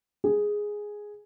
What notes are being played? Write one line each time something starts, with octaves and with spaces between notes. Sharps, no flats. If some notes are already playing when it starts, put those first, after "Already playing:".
G#4